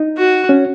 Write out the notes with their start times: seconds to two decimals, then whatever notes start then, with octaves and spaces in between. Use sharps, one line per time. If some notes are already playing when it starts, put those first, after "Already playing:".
Already playing: D#4
0.17 F#4
0.49 C#4